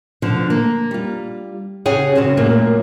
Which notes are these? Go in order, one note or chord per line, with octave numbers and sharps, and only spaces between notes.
B2 D3 F3
A#3
G3 F4
C#3 C#4 G4 G#4 C#5 F#5
F#2 C#3 C4 C#4 F#4
F#2 A#2 F#3 A3 A#3